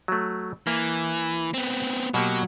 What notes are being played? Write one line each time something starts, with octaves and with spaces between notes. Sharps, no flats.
F#3 A3
E3 A#3
B3 C4
B2 F#3 A#3 G4